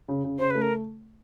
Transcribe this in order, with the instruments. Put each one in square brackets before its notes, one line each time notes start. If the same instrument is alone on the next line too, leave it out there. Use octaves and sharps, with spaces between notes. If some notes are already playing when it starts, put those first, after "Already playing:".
[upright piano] C#3
C#3
[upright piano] C#3 [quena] C5
[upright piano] A3 [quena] B4
[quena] A#4